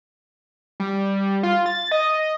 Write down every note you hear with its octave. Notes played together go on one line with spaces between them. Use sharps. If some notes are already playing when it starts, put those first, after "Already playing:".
G3
F4
A6
D#5